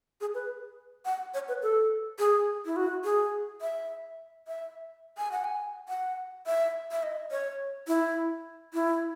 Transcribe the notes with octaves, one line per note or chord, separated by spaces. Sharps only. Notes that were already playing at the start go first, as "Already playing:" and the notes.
G#4
B4
F#5
C#5
B4
A4
G#4
E4
F#4
G#4
E5
E5
G#5
F#5
G#5
F#5
E5
E5
D#5
C#5
E4
E4